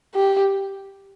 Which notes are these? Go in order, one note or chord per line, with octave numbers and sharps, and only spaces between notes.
G4